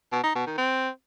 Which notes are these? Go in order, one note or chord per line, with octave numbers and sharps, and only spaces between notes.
B2
D#4
B2
D#3
C4